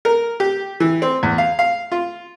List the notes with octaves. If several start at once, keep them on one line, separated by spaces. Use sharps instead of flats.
A#4
G4
E3
C4
E2
F5
F5
F4